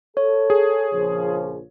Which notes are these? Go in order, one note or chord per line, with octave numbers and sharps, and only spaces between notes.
A4 C#5
G#4
A#1 C#3 F3